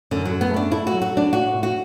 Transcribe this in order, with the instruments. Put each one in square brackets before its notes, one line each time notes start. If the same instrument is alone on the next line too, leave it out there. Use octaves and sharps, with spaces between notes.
[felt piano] F#2 [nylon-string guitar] D3
[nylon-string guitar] F#3
[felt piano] F#2
[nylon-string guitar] B3
[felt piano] A3
[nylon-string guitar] D4
[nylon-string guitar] E4 [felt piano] A4
[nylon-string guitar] F#4
[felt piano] F#3
[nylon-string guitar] F#4
[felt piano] F#3 [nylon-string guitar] D4
[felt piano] A2 [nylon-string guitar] F#4
[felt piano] A2
[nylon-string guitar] F#4